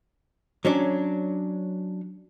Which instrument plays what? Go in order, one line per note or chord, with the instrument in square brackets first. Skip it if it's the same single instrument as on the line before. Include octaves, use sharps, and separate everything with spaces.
[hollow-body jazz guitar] F#3 C#4 D4